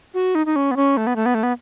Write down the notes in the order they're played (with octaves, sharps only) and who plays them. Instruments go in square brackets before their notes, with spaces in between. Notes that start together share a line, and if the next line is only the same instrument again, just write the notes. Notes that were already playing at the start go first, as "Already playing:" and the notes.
[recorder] F#4
D#4
D#4
C#4
B3
C#4
A3
B3
A3
B3
A3
B3